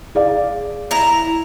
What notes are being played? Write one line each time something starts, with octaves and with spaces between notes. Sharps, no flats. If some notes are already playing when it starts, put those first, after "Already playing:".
G#4 D5 F5
E4 A#5